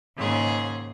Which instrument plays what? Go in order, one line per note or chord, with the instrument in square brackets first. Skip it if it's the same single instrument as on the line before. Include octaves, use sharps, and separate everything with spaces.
[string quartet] D#2 G#2 C#3 G#4 C6